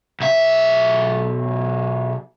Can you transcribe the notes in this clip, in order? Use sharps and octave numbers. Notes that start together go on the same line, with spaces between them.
B1 E5